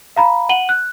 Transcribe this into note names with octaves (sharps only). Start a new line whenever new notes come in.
F5 A#5 B5
F#5 D#7 F#7 G7
F#6